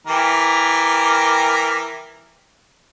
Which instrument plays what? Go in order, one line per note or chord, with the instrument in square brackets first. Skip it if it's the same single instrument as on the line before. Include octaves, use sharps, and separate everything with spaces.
[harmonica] E3 G4 A#4